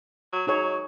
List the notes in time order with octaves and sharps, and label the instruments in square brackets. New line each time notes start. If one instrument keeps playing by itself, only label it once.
[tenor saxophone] F#3
[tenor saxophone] F#3 [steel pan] D#4 G#4 C#5